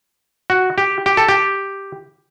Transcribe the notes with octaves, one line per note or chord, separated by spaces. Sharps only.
F#4
G4
G4
A4
G4